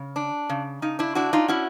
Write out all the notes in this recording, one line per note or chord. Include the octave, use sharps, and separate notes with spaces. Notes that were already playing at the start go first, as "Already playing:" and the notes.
Already playing: C#3
D4
C#3
C#3 D#4
D4 E4
D4 E4 F#4
D#4 F4
C#4 E4 F#4